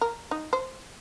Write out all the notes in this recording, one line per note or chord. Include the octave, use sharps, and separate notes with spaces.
A#4
D#4
C5